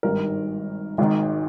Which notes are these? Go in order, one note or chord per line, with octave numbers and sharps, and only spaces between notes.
G#1 G2 D#3 A#4
G#1 G#2 D#3